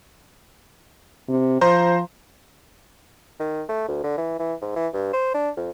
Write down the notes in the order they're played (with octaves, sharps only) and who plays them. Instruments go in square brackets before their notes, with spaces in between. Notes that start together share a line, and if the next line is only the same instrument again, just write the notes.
[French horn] C3
[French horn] F3 [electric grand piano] C5 A#5 C6
[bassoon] D#3
A3
D2
D3
E3
E3
G#2
E3
G2
C5
D4
F2